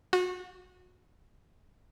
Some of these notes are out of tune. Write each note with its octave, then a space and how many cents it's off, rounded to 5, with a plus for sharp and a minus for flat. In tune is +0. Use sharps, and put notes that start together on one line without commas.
F#4 -30